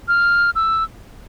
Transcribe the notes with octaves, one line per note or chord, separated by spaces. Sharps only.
F6
E6